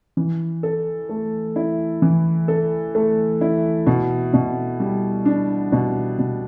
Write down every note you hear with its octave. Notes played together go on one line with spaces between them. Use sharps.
E3
A4
A3
E4
E3
A4
A3
E4
B2
B2
G3
D4
B2
B2